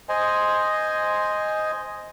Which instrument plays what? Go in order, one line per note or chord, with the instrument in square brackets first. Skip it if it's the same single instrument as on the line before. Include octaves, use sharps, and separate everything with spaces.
[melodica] C5 D#5 G#5